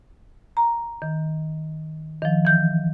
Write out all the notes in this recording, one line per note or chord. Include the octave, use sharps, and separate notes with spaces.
A#5
D#3
D#3 F3
E3 G6